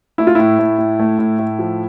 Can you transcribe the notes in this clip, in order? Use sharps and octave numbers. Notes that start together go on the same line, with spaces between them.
A3 E4
F4
A2 E4
A2
A2
A3
A2
A2
F3